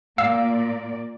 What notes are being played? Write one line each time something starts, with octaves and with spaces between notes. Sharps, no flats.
A#2 A#3 D5 F5 E6